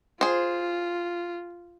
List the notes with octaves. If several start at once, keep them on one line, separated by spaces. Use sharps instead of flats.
F4 G#4 C5